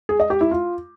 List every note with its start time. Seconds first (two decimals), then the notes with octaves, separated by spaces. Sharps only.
0.09 G#4
0.20 D#5
0.30 G4
0.41 E4
0.51 F4